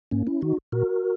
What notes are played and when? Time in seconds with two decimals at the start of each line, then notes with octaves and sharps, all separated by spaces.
0.11 G#2 A#3 C#4
0.27 C#4 E4
0.42 D#3 D#4 F#4
0.72 A#2 F#4 A#4